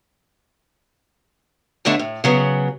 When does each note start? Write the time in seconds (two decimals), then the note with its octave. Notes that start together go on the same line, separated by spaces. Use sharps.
1.85 D#2 D3 A3 B3 D4
1.99 A2
2.24 C#3 F#3 B3